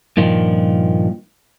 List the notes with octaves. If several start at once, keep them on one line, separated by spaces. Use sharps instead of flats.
G2 A#2 D#3 F3